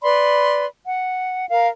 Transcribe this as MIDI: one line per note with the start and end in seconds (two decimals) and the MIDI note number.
0.03 0.65 71
0.03 0.65 74
0.03 0.65 83
0.03 0.65 84
0.86 1.49 78
1.49 1.68 70
1.49 1.68 77